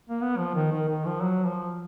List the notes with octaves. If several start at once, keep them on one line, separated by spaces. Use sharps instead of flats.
A#3
B3
F3
D#3
D#3
D#3
F3
F#3
F3